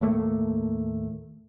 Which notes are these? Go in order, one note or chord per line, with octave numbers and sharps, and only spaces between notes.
D#2 A2 A3 A#3